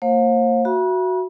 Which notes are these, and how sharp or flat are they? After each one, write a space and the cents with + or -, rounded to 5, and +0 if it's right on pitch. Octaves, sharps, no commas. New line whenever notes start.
A#3 -35 C5 +40 F5 +35
F#4 +0 E5 +35 B5 -40